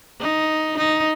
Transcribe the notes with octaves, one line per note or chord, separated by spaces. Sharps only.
D#4
D#4